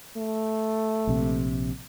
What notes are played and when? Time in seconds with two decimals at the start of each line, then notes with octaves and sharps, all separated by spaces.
0.17 A3
1.07 A#1 C3